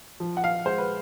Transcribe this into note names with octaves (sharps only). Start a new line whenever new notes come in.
F3
F#5
F5
G#3 C5
B4